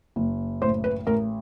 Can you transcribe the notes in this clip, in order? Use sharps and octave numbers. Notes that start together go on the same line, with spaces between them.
F#1
A1 C5
B4
A1 A#4